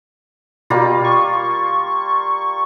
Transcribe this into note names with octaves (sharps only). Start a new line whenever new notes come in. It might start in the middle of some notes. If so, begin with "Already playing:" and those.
B2 G3 A#3 F4
C#6